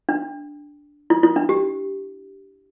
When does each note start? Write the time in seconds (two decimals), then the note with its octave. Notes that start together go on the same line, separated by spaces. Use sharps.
0.09 D4
1.10 E4
1.23 E4
1.36 D4
1.49 G4